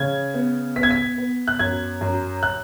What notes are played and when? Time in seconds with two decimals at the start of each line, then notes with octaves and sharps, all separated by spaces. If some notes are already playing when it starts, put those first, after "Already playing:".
Already playing: C#3 G#6
0.34 B3
0.76 B3 B6
0.83 G#6
0.91 B6
1.18 B3
1.48 F#6
1.59 F#2 G#6
2.01 F#2
2.43 F#6